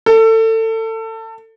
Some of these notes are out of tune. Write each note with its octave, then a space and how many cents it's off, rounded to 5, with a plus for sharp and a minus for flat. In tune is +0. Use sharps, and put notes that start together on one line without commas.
A4 +25